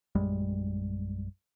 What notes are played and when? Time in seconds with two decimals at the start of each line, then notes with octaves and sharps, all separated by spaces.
0.15 A#1 F#2 G3 G#3